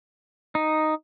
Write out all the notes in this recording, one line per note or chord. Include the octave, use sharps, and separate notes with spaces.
D#4